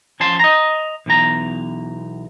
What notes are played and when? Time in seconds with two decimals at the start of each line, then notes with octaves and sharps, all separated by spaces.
0.20 F3 C#4 A5 C6
0.39 D#5 A#5
1.06 B1 E2 A#5